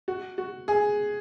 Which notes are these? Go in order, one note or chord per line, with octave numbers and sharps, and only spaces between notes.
F#4
F#4
G#4